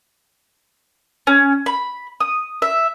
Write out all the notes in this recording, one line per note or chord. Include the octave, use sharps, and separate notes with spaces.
C#4
B5
D#6
E5